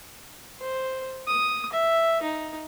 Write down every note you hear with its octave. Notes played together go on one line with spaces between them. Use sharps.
C5
D#6
E5
D#4